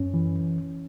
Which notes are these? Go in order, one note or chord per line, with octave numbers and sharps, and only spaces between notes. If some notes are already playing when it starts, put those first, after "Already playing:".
Already playing: F#2 C#4
E3